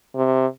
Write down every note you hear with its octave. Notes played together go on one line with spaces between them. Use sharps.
C3